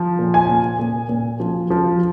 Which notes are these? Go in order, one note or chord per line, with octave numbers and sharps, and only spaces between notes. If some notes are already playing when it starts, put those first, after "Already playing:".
Already playing: F3
A#2
G#5
A#2
A#2
A#2
F3
F3